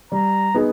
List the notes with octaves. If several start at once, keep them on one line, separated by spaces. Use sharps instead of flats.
G3 A#5
B3 D#4 G#4